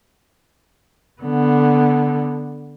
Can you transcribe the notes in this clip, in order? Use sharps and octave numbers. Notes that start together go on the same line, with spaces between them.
D3 B3